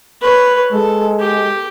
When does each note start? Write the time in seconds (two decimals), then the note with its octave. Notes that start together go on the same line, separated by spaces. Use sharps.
0.22 B4 C#5
0.72 G#3 A4
1.20 G4